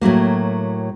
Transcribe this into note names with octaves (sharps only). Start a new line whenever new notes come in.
A2 F#3 A3 A#3